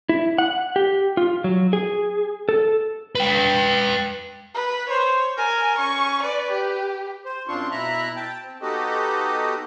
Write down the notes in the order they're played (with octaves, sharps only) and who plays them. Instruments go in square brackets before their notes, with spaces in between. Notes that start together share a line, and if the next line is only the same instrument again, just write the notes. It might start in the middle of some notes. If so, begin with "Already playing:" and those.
[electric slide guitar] E4
F#5
G4
F4
F#3
G#4
A4
[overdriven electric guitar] B4 G5
[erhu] B4
[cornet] C5 [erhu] C#5
[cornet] A#4 [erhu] G#5
[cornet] C#4 [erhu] C#6
[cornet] B4 [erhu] D5
[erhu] G4
[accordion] C5
F#2 C4 D4 F4 C6 C#6
B2 E4 E5 A#5 F#6
G5 A5
C4
B3 D#4 F#4 G4 A4 D#5